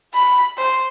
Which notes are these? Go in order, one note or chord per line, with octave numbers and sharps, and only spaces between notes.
B5
C5